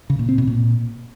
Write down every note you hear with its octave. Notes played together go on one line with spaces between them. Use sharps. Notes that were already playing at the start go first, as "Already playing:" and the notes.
C#3
A#2
C4
B2
A#2